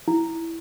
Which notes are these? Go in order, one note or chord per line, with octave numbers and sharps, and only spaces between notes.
E4